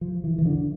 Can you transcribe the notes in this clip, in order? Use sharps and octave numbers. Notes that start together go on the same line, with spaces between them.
F3
E3
E3
D3